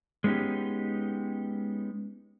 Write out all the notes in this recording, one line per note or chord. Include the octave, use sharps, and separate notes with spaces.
G#3 B3 C#4 D#4 G4